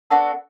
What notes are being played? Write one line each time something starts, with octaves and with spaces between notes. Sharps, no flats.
B3 D4 F#4 A4